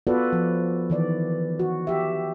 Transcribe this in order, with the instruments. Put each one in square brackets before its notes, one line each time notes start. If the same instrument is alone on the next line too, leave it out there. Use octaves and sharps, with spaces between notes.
[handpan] B3 F4 F#4 A4 B4 D5
F3
D#3 E3 D5
F#4
G4 E5